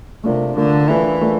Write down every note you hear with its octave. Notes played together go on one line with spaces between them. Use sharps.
C3 A3 D4 F4 A#4
D3 A3 D4 F4 A#4
E3 A3 D4 F4 A#4
A3 D4 F4 A#4